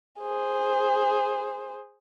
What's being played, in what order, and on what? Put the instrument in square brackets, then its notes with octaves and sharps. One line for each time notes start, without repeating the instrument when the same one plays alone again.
[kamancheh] G#4 C5